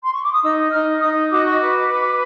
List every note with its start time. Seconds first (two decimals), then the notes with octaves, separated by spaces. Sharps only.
0.03 C6
0.12 C#6
0.22 D6
0.33 D#6
0.43 D#4 E6
0.72 D#4 F6
1.01 D#4 D#6
1.31 F#4 D6
1.44 C#6
1.58 B4 D6
1.88 B4